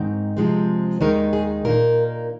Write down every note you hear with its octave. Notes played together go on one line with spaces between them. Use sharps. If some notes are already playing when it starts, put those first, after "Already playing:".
Already playing: G#2 D#3 C4 D#4
C3 F3 G#3 C4
D#2 D#3 G#3 D#4 A#4
G#4
A#2 A#3 D#4 A#4